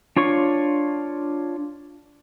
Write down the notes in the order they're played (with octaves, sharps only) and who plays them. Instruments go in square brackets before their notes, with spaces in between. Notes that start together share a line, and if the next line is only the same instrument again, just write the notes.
[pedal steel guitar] D4 F4 C#5 C#6